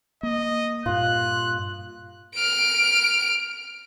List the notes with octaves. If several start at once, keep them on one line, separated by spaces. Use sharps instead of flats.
A#3 D#5
G2 A#2 F4 F#6
F6 D7